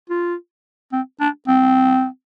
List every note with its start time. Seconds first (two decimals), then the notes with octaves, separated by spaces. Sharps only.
0.10 F4
0.93 C4
1.20 D4
1.48 C4